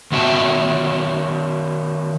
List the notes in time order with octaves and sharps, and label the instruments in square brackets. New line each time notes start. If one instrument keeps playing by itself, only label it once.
[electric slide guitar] D#3 B3 F#4 E5 G5 A5